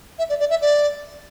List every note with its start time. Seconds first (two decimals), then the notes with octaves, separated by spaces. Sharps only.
0.18 E5
0.29 D5
0.39 D5
0.49 E5
0.61 D5